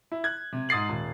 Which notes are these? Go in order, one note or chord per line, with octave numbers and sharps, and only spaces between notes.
E4
F#6 G#6
C3
G#2 D#6 A6 C7 F#7
D#1